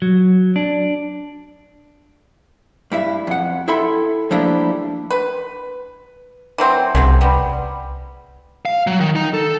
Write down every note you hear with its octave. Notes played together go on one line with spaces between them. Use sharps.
F#3
D4
G2 E4 E5
F2 F#5
E4 A4 E5 G5 B5 C6
F3 G3 A3 A#3 D4 E4
B4
E3 F#3 C4
C2 C#3 F#3 C4
G3 B3
F5
F#3
D#3
D#4
A4